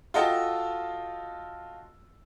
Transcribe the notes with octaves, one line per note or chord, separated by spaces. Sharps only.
F4 F#4 A4 D#5 G5 A5